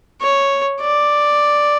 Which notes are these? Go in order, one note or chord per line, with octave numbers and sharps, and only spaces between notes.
C#5
D5